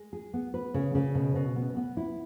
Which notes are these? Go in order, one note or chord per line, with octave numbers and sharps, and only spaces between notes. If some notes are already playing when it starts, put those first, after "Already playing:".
Already playing: G#3
G#4
B3
B4
C#3
C#3
B2
B2
B3
B3
E4